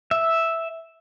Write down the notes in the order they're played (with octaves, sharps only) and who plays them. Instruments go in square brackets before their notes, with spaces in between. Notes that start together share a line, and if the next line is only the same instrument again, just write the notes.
[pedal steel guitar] E5